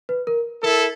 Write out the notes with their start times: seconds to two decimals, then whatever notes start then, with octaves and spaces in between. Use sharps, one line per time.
0.09 B4
0.27 A#4
0.62 E4 A4 A#4